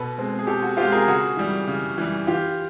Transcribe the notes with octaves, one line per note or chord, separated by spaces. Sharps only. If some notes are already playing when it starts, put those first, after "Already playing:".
Already playing: B2 A4 B4
G#3 C4
G#4
B2 G4 A4
F#4
G#3 C4 F4 G4
G#4 A#4
C#3 F#4 G#4
E3 G3
C#3
E3 G3
E3 F4 G4